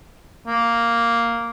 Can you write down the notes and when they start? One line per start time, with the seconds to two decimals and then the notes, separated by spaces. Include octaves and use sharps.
0.48 A#3